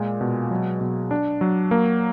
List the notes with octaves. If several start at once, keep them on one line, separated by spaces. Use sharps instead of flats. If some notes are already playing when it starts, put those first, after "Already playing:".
Already playing: A#2 G#3
B2
F#3
B2
D4
F#3
A#3